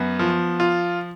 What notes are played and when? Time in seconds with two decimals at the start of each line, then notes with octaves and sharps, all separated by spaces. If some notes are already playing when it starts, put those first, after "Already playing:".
Already playing: F#2 B3
0.19 F3
0.60 F4